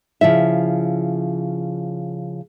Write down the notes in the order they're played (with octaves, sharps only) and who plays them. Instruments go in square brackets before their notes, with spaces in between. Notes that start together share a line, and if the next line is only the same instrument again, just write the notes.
[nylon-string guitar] C#3 F3 E4 E5